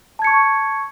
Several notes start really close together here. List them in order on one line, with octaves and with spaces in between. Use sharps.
A5 G#6 C#7 C#6